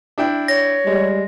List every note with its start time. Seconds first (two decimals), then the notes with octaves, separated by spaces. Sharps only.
0.18 D4 E4 G5
0.48 C#5 A#6
0.87 G3 G#3